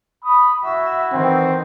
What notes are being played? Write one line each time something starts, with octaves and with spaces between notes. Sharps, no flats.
B5 D#6
E4 F#4 E5
D#3 E3 C4